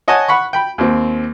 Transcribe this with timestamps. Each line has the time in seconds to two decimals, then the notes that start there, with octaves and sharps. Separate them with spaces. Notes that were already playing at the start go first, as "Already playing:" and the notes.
0.08 C#5 D#5 F#5 G#5 A5
0.28 F#5 B5 C#6
0.53 G5 B5
0.78 D#2 C4